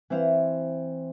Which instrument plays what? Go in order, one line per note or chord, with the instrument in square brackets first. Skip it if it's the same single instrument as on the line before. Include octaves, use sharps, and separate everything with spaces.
[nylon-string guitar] E3 C4 E4 C5 F5